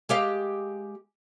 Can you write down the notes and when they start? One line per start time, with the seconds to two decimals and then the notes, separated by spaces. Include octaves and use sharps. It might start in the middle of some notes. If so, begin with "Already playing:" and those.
0.09 G#3 G4 F5